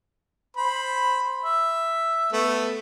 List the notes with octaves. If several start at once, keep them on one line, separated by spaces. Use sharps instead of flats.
C5 B5
E5
A3 B3